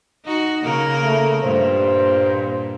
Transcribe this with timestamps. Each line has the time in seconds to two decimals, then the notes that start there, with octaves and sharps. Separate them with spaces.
0.24 D#4 F#4
0.62 C#3 A#3 A#4
1.04 A3
1.43 G2 A#2 C5